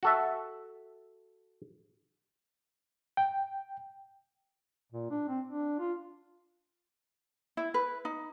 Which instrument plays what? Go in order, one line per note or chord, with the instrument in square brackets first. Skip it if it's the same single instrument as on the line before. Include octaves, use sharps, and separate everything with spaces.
[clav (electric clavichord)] F#4 A4 E5
[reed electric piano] G5
[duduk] A#2
D4
C4
D4
F4
[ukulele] E4
B4
D#4